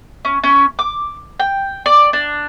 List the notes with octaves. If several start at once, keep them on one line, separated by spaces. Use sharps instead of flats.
C#4
C#4
D6
G5
D5
D4